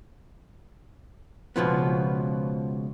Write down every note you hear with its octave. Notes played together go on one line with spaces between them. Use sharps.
C#2 B2 F3 B3